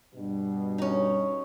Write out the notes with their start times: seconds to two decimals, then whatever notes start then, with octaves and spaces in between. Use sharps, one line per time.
0.16 G2 B2 G3
0.78 C#4 D#4